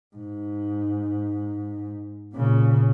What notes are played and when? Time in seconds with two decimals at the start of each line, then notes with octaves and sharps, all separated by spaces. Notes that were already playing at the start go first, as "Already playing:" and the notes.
0.16 G#2
2.33 A#2 C#3